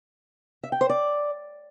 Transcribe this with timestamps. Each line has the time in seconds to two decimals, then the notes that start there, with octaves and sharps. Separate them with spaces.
0.63 E5
0.72 G5
0.81 C5
0.89 D5